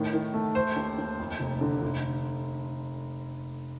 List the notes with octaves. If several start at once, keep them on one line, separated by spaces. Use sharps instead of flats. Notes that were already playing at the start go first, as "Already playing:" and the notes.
Already playing: A2 D#3
D#3
A3
A3 C5
D#2
D#2
F2
F1
D3
F1